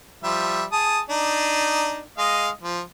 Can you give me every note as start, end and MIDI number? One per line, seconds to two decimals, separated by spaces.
0.23 0.64 53
0.23 0.64 55
0.23 0.64 76
0.72 0.99 68
0.72 0.99 81
0.72 0.99 87
1.10 2.01 62
1.10 2.01 63
2.18 2.50 56
2.18 2.50 75
2.18 2.50 77
2.63 2.80 53